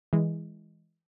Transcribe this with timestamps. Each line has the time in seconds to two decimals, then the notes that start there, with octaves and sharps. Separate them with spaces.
0.13 E3 G#3